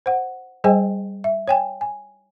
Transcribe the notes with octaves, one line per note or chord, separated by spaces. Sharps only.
C5 F#5
G3 G#4 C5 D#5 G5 G#5
E5
C#5 G5 G#5
G#5